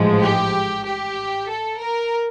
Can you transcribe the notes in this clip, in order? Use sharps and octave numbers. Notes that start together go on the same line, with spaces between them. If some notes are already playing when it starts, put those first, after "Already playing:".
Already playing: A1 G#2 F3 G#3
G4
G4
A4
A#4